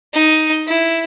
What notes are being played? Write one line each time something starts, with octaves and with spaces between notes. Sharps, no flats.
D#4
E4